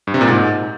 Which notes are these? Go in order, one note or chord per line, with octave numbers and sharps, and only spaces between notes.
G2
C3
A#2
G#2